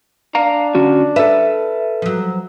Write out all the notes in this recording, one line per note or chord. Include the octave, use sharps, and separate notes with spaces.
D4 F5 A#5
D3 C#4 F#4
A4 B4 E5
F3 F#3